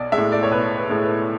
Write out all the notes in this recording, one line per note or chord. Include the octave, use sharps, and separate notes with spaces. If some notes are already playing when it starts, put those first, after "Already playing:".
Already playing: B1 D5
G#3 E5
A2
D5
C#5
B1 B4
B4
A2 G#3
B4